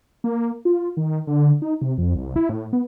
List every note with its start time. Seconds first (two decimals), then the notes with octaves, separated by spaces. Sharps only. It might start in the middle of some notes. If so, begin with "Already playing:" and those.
0.24 A#3
0.65 F4
0.97 D#3
1.27 D3
1.62 D#4
1.82 C3
1.98 F2
2.16 C2
2.36 E4
2.49 A2
2.73 B3